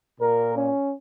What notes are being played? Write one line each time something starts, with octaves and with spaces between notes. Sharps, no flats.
A#2 A#4
C#4